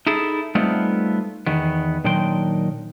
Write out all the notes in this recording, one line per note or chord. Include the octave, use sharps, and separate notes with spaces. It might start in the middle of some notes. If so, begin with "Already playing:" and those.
D#4 E4 G#4 A4
G3 A3 B3 C4 D#4 F4
E2 D#3 B3
A#2 D#3 F#3 D4 G5 C6